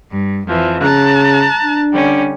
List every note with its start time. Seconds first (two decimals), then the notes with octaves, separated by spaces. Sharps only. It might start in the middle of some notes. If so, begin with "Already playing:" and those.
0.11 G2
0.47 F2 E3 F3
0.82 C#3 A5 A#5 F#6
1.63 D4
1.93 D3 G3 C#4